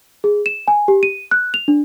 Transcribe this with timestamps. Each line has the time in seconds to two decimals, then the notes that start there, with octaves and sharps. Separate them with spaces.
0.24 G#4
0.46 E7
0.68 G#5
0.88 G4
1.03 D#7
1.31 F#6
1.54 F7
1.68 D4